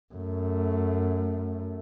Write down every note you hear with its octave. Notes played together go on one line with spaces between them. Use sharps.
F#2 A3